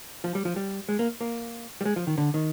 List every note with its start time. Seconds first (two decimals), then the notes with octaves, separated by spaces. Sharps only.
0.24 F3
0.35 G3
0.45 F3
0.56 G3
0.89 G#3
0.99 A#3
1.21 A#3
1.81 G3
1.85 G#3
1.96 F3
2.07 D#3
2.18 D3
2.34 D#3